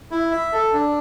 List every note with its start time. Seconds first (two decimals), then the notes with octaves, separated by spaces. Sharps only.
0.11 E4
0.32 E5
0.52 A4
0.73 D4